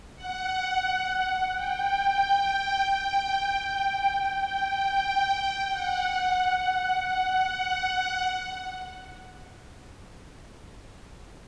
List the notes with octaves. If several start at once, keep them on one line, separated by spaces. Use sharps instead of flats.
F#5
G5
G5
G5
F#5